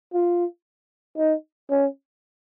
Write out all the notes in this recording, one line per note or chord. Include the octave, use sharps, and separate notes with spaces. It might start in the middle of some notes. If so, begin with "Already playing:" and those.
F4
D#4
C#4